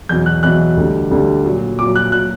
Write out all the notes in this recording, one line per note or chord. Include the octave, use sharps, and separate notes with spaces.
E2 B2 F#3 G6
F#6
E2 B2 F#3 F#6
D2 D3 G3
D2 D3 G3
A#2 F#3
A#2 F#3 D6
F#6
A#2 F#3 F#6